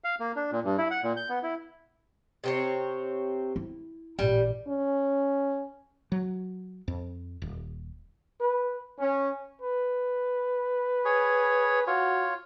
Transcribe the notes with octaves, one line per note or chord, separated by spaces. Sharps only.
F5
A#3
D4
A#2
G2
E4
F#5
A#2
G6
B3
E4
C3 C4 C#5
E4
A1 A#2 G3
C#4
F#3
F2
D#1
B4
C#4
B4
G#4 C#5
F4 F#4 C#5